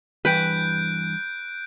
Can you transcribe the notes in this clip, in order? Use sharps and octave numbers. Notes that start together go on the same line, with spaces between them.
G2 E3 B4 G5 F#6 G6 D7